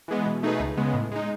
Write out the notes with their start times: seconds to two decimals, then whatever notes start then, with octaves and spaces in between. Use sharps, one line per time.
0.08 E3 G#3 B3
0.26 B2
0.43 A3 D#4 G#4 B4
0.60 C#2
0.77 C#3 G#3 B3
0.94 A2
1.11 G#3 D#4